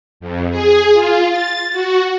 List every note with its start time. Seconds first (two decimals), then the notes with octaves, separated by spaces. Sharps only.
0.20 F2
0.50 G#4
0.93 F4
1.29 A6
1.72 F#4